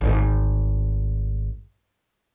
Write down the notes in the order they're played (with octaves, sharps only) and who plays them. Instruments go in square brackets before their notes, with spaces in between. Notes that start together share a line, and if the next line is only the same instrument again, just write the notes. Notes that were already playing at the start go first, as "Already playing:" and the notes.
[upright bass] G#1 D2